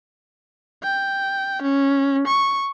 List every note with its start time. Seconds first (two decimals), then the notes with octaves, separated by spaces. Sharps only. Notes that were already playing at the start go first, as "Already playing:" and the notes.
0.83 G5
1.62 C#4
2.27 C#6